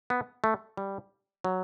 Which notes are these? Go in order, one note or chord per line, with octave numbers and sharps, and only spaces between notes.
B3
A3
G3
F#3